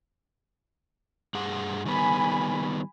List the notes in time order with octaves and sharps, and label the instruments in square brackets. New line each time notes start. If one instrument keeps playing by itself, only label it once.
[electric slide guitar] G2 G#4 F#5
[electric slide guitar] D#3 G3 B3 [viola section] G#5 B5